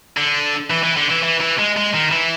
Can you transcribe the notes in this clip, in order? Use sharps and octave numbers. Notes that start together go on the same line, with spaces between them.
D3
E3
E3
D3
E3
E3
E3
G#3
G#3
D#3
E3